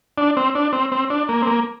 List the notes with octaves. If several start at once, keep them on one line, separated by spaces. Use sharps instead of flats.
D4
C4
D4
C4
C4
D4
A#3
C4
A#3